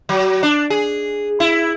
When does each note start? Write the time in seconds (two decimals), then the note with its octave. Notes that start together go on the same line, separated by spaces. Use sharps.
0.09 F#3
0.43 D4
0.70 G#4
1.40 E4